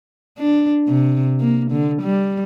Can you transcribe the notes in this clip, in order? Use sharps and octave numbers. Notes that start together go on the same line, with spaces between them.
D4
C3
A#3
D3
G3